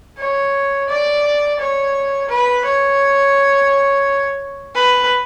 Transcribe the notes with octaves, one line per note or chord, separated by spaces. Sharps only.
C#5
D5
C#5
B4
C#5
B4